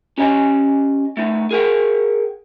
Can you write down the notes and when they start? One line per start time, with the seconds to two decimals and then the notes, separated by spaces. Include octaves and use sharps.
0.18 C#4 G4 C#5 D#5 G#5
1.17 A3 B3 D#4
1.51 G#4 A#4 F#5 G5